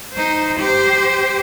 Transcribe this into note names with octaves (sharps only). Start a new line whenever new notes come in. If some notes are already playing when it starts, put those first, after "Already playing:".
D#4 C5
G4 C5